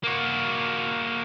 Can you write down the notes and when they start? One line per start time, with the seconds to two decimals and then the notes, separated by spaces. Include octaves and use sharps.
0.04 A#3 F#4